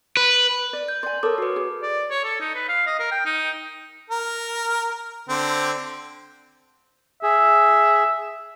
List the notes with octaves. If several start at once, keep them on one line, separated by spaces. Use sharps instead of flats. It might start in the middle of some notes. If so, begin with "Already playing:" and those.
B4
D5
G6
D5 G#5 C6
A4 A#4 C#5 D6 D#6
F#4 B4
G#4
D5
C#5
A4
D#4
B4
F5
D#5
A#4
G5
D#4
A#4
D3 C4
G#4 E5